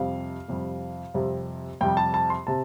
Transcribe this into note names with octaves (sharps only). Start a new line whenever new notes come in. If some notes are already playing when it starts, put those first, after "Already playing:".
Already playing: F2 C3 G3 F5
F2 C3 G3
F2 C3 G3
F2 C3 G3 G5
A5
A5
C6
C3 A5